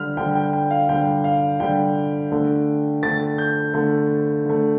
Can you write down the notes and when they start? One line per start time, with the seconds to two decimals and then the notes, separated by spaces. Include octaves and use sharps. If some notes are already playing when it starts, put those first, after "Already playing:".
Already playing: D3 G3 F6
0.17 D3 G3 G5
0.35 G5
0.53 G5
0.71 F5
0.89 D3 G3 G5
1.24 F5
1.60 D3 G3 G5
2.31 D3 A3
3.03 D3 A3 A6
3.38 G6
3.74 D3 A3
4.46 D3 A3